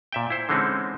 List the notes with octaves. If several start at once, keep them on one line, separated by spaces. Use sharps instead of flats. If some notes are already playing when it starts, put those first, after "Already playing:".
A#2 E5 G5
E4 C5
D3 E3 G#3 C4 C#4 D#4